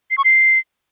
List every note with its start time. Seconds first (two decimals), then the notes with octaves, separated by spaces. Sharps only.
0.11 C7
0.18 C#6
0.25 C7